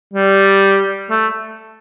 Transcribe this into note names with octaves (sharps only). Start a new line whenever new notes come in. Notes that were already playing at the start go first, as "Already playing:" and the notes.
G3
A3